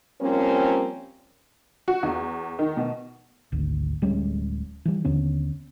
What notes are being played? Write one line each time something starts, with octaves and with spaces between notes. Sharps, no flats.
F3 G3 A#3 C4 C#4
F#4
E2
D#3
B2
G#1 D2
D1 G3 G#3 C#4
E3 G3
D#2 D3 B3 C#4